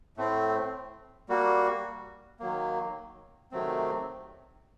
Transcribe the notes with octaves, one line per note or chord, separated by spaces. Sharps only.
A2 A3 C4
G3 A#3 F#4
D#3 F#3 A#3
C3 D#3 F#3 A3 C4